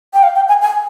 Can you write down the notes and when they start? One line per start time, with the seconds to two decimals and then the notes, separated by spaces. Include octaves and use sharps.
0.14 G5
0.23 F5
0.35 G5
0.48 G#5
0.62 G#5